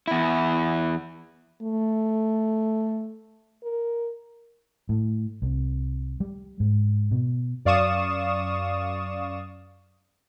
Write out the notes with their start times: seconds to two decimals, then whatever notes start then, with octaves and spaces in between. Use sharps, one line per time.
0.07 E2 E4
1.62 A3
3.63 A#4
4.89 A2
5.42 C2
6.20 G3
6.60 G#2
7.11 B2
7.65 F#2 D5 F5 C#6 D#6 E7